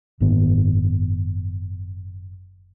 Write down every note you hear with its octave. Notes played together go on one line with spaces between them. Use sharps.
F#1 G#2 D#3 B3